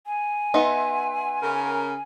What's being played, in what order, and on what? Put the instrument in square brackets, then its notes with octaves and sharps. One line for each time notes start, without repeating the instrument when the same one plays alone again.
[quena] G#5
[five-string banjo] B3 D#4 [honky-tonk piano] E5 F#5 C6
[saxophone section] C#3 C#4 A#4